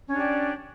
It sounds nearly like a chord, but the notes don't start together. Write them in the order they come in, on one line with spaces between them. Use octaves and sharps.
C#4 D4 G4 D5